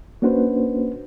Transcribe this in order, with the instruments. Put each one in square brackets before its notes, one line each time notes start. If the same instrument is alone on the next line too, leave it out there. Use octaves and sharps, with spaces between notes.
[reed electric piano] A#3 C#4 D4 F#4 B4 C5